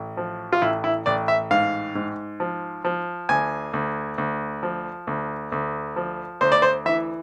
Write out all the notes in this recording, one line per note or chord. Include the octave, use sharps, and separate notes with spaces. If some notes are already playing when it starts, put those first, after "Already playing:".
Already playing: A1
F3
F4
A1 E4
E4
A1 D5
E5
G#2 F5
G#2
F3
F3
D2 G#5
D2
D2
F3
D2
D2
F3
D2 C5
D5
C5
E3 E5